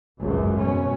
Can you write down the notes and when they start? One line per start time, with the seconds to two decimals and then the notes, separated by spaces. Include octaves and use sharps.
0.21 G#1 C#2 F#2
0.59 B2 C#4